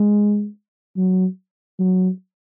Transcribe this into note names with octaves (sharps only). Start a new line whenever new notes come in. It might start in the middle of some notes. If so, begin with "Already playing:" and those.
Already playing: G#3
F#3
F#3